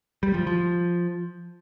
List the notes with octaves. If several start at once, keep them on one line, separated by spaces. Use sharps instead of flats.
G3
F3
F3